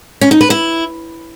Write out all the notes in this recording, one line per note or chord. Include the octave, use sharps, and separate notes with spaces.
C#4
D#4
B4
E4